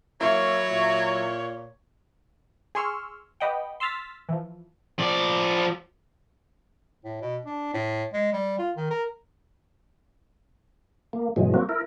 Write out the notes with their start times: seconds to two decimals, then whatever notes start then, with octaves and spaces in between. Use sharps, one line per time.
0.21 F#3 A#3 E4 C#5
0.70 A#2
2.75 G#4 G#5 C6 C#6 E6 F6
3.40 G4 B4 D#5 F#5 G5
3.80 C6 E6 F6 A6 B6
4.29 E3 F3
4.99 F3 D5
7.05 A2
7.21 B2
7.45 D4
7.74 A2
8.13 G#3
8.33 G3
8.58 F4
8.77 D#3
8.90 A#4
11.13 A#3
11.36 G2 B2 E3 F#3 G#3
11.54 F#3 A#3 C4 F#4
11.69 E4 A#4